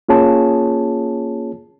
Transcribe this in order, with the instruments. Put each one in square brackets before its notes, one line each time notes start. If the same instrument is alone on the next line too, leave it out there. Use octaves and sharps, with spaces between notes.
[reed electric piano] A#3 C#4 F4 G#4 C#5 A5